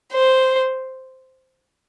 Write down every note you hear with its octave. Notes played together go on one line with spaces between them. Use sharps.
C5